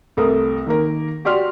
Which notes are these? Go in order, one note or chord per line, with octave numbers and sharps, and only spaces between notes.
C2 A3 A4 A#4 D#6
D#3 A#3 A#4
F#4 G4 D5 C6 F6